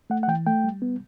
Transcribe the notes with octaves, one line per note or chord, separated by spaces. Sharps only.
A3 F#5
F#5
E3 G5
A3 G5
G3
B3